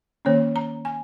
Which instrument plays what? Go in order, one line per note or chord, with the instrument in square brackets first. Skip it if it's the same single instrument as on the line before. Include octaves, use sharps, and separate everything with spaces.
[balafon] D#3 A#3 C#4 C#5
A#5
G#5